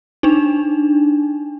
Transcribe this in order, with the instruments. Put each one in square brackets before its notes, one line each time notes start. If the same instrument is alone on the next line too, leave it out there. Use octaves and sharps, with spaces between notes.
[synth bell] D4 D#4